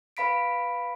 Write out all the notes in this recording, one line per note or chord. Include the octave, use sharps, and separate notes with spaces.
B4 F5 B5 B6 D7